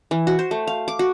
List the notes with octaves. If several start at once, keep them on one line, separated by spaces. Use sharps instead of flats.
E3
F#4
C5
A3
F5
D6
F#4